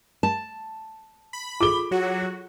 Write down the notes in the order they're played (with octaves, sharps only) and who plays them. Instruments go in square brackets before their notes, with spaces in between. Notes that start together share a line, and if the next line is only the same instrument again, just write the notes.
[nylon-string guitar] A5
[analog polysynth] B5
[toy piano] F4 G#4 A4 [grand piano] D6 G7
[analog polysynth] F#3 F#4